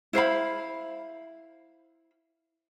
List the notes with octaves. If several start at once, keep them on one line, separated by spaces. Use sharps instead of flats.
E4 C5 F5 B5